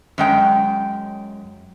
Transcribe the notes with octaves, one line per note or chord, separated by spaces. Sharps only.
F#2 G#3 G5